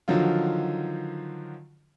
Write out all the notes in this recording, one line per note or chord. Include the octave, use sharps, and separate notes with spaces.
D3 D#3 F3 F#3 D#4 F4